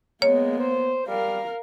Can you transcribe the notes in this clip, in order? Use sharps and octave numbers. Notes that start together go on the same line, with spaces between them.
G#3 A#3 B3 C#5
C5
G3 A#4 F5